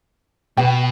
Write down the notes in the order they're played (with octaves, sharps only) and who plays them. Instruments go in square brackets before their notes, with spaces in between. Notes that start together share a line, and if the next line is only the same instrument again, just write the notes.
[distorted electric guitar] B2 [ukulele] G5